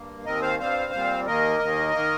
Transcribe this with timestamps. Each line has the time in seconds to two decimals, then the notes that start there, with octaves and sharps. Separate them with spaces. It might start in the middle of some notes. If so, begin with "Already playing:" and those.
Already playing: G2 A#3
0.25 D#2 D#3 C4 A#4 D#5
0.42 C5 F5
0.59 G2 G3 C4 C5 F5
0.92 A#2 G3 C4
1.26 D#2 D#3 A#3 A#4 D#5
1.60 D#2 D#3 A#3
1.93 D#3 A#3